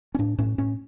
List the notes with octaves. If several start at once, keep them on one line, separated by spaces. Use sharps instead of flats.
C#4
A2 D4
A2 C#4
A2 C#4